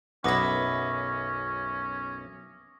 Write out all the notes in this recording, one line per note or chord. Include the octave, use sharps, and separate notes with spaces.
B1 F#2 B3 C#4 E4 D6 D#6 A#6